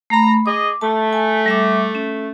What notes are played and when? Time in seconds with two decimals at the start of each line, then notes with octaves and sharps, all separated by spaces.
0.10 A3 A#5 B5
0.46 G#4 D#5 D6
0.81 A3 A5
1.13 G#5 A5
1.46 G3 E5 D6
1.95 C#4